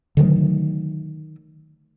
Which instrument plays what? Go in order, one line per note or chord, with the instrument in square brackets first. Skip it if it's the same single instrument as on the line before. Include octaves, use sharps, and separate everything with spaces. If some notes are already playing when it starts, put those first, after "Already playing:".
[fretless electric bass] D3 D#3 F#3 A3